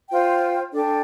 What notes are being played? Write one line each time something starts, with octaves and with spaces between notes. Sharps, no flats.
F4 C5 G5
D4 A4 D5 G5